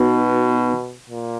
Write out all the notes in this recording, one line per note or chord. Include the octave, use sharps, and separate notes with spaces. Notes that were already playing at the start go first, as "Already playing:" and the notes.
Already playing: B2 B3 D#4 F#4 B4
A#2